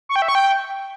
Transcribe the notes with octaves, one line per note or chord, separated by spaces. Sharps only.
C#6
G5
E5
C#6
G5